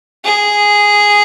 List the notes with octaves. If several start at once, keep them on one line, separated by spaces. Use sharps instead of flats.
G#4